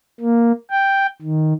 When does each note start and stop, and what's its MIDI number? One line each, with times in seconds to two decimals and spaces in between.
0.20 0.52 58
0.70 1.07 79
1.22 1.54 51